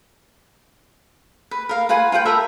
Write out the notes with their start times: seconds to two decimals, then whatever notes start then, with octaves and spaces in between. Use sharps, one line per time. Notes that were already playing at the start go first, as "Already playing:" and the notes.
1.51 B4
1.69 A#4 F5
1.89 F4 B4 F#5 G#5
2.12 F4 B4 F#5 G5
2.25 A4 A#4 E5 B5